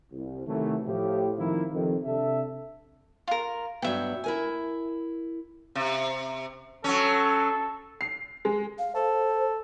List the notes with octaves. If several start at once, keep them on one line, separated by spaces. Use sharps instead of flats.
C2
C3 D#3 E3 F#3 A3
A2 F3 E4 G4
D#3 F3 A#3 C4 D#4 E4
F2 C3 D#3
C3 D4 A4 E5
F4 A#4
G2 F#3 B3 E5 G5
E4 A#4 G#5
C3
F#3 C#4 A4
C7
G#3
F5
A4 C5